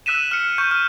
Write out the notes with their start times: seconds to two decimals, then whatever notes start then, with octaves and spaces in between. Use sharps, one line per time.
0.06 E6 F#6 B6 D#7 E7
0.31 F6 C#7
0.58 C#6 G6
0.71 F6